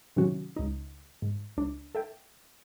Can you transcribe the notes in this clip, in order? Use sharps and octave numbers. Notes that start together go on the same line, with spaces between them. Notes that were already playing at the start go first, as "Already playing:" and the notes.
A2 C3 D#3 F#3 C#4 F#4
C#2 D#4
G#2
C#2 D4
A4 E5 G5